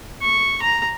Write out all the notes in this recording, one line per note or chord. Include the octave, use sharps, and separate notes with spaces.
C#6
A#5